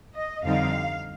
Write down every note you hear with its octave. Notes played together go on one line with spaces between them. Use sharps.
D#5
F2 D3 G3 C4 D#4 F5